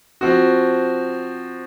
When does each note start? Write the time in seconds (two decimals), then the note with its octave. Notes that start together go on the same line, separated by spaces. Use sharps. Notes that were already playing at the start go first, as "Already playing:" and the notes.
0.21 F3 C4 F#4